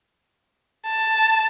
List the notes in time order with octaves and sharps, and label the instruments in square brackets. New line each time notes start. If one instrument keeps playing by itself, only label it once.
[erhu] A5